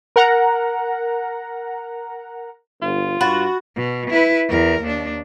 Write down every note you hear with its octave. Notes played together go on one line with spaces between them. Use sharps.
A#4 F#5 A#5
G1 F4
G2 F#4 B5 A6
B2
E4 B4
E2 A#4
D#2 D4